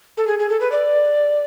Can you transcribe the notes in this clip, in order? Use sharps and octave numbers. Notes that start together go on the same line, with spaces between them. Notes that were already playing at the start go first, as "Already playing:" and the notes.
A4
G#4
G#4
A4
B4
D5